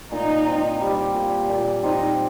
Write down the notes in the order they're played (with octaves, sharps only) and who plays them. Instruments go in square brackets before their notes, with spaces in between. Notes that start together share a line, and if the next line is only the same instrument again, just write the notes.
[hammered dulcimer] A#2 [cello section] D#4
[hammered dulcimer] C4
G3
A#2
A#2
[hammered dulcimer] C4 [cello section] D#4